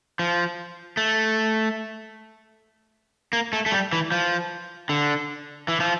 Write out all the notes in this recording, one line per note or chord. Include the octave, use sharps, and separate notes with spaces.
F3
A3
A#3
A3
A3
G3
E3
F3
D3
E3
F3